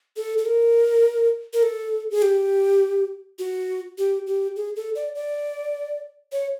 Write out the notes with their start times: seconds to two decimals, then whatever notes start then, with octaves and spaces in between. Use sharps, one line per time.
0.16 A4
0.38 A4
0.46 A#4
1.53 A#4
1.63 A4
2.11 G#4
2.22 G4
3.39 F#4
3.98 G4
4.27 G4
4.56 G#4
4.76 A4
4.95 D5
5.15 D5
6.32 C#5